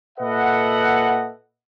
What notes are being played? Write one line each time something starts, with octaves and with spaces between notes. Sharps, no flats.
A#2 A4 B4 D#5 E5 F#5